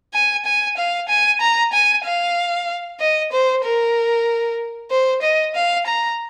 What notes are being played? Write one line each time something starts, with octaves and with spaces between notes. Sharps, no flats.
G#5
G#5
F5
G#5
A#5
G#5
F5
D#5
C5
A#4
C5
D#5
F5
A#5